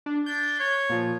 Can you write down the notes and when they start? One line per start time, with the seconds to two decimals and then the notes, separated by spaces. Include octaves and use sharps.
0.06 D4
0.26 D4 G6
0.60 C#5
0.90 A#2 F3